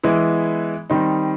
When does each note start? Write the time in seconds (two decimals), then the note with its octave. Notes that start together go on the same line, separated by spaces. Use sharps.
0.03 E3 G#3 B3 E4
0.90 D#3 G3 C4 D#4